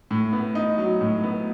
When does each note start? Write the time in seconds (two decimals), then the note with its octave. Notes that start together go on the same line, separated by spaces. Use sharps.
0.11 A2
0.33 B3
0.55 D#4
0.78 F#3
1.01 A2
1.24 B3